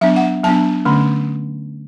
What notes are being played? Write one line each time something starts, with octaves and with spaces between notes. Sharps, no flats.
F#3 B3 D4 E5
F#5
F#3 B3 D4 A5
D3 A3 C#4